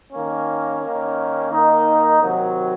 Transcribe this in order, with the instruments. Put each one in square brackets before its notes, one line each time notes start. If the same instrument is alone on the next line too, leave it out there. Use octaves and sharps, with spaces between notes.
[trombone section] D#3 A#3 C#4
D#3 A#3 C#4
D#3 A#3 D#4
C3 D#3 F#3